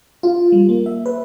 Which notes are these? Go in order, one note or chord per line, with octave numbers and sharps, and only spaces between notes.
F4
G3
A#3
E5
B4